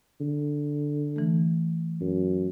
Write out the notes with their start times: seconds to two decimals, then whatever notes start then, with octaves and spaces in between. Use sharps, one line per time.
0.21 D3
1.16 E3 A3
2.01 F#2